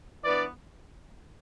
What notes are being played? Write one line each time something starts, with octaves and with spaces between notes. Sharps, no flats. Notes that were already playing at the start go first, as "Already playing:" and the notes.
E3 B3 D4 B4 D5